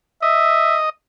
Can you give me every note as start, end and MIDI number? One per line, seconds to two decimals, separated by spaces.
0.22 0.89 75
0.22 0.77 76